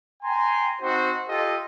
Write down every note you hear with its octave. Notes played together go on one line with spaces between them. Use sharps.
G5 G#5 A#5 C6
C4 D#4 F#4 C5
F4 G4 A4 D#5